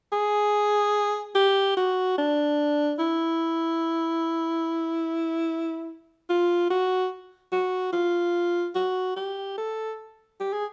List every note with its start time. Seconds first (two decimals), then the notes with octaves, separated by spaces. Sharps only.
0.12 G#4
1.35 G4
1.77 F#4
2.18 D4
2.99 E4
6.29 F4
6.70 F#4
7.52 F#4
7.93 F4
8.75 F#4
9.16 G4
9.58 A4
10.40 G4
10.53 G#4